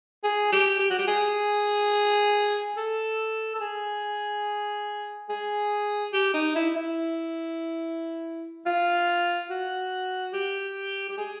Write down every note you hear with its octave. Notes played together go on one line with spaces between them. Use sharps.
G#4
G4
G4
F#4
G4
G#4
A4
A4
G#4
G#4
G4
D#4
E4
E4
F4
F#4
G4
G4
G#4